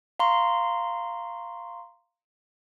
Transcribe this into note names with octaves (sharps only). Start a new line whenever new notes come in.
F5 A#5 C6 C#6